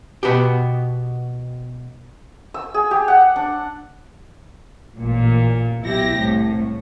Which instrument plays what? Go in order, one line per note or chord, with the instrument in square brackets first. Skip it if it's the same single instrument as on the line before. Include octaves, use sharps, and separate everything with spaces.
[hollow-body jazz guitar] B2 B3 F#4 G4
[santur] E6
G#4
G4
F#5
D4
[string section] A1 A#2
B1 E4 G4 A#6
C2 A2